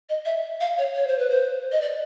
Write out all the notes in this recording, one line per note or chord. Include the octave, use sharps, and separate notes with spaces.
D#5
E5
F5
C#5
C#5
C5
B4
C5
D#5
D5